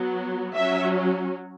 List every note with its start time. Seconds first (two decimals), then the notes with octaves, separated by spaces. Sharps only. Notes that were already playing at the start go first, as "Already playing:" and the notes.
Already playing: F#3 B3
0.55 F#3 C#4 E5